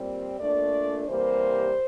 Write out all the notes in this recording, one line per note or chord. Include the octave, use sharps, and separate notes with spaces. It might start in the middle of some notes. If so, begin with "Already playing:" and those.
Already playing: A#2 G3 C4
A#2 A3 D4 D5
C3 E3 G3 A#3 C5